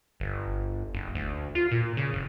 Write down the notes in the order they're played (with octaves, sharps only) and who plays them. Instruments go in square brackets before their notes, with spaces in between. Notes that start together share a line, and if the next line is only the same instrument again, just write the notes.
[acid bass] G1
F#1
D2
F4
A#2
C#3
F#1